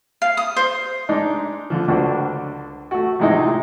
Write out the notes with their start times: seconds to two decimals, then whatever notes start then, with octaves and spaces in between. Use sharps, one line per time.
0.22 F5
0.37 D#6
0.56 C5
1.09 G#3 D4 D#4
1.70 D3 F3
1.88 C#2 D3 D4 F#4 C5
2.91 A3 F#4
3.20 A2 C3 F3 G#3 C4 D#4